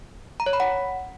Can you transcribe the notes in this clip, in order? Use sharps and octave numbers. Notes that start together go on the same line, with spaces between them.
A#5
C#5
B5
F#5